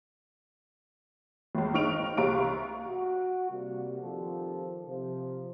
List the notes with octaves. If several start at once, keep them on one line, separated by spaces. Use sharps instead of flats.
G1 C#2
G#1 D#4 C#6 F6 D7 F7
C2 C3 F5 A#5 C#6 D7
F#4
C3 G3 A#3
D#3 F3 C4 F4 G4 A4
C3 F3